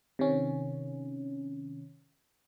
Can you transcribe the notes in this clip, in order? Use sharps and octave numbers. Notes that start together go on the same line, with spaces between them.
C3 D#3 C#4